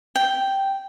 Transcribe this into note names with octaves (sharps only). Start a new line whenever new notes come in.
G5